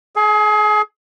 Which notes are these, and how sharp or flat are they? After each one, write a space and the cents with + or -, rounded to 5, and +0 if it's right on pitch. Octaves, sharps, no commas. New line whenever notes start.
G#4 +35 G#5 +0